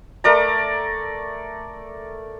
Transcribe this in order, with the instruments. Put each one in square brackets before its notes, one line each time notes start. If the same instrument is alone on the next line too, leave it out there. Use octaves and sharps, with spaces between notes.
[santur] A3 A#4 D5 A#5